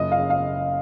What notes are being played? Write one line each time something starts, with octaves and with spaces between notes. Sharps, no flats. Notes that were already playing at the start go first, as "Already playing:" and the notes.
Already playing: F#1 D#5
F5
C#3
F5